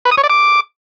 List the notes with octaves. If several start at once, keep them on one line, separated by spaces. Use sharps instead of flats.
B4
D#6
C#5
D5
D6